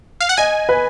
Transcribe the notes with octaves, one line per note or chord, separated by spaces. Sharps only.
F5
F#5
D#5 G#5
B4